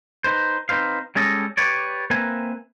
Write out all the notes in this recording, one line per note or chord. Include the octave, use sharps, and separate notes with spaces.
D#4 B4 C5
C4 D#4 B4 C5 F5
G3 G#3 C#4 A4 D#5
G4 B4 C#5 D5
A#3 C4 A#4 B4 E5 G#5